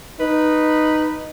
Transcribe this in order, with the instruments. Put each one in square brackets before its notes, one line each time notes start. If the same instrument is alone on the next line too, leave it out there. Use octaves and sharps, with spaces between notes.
[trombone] D#4 [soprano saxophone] B4